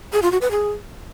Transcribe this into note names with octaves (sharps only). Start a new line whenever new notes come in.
G#4
F4
F#4
B4
G#4